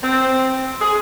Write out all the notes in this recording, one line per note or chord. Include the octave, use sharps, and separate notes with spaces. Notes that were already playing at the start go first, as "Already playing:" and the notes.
C4
G#4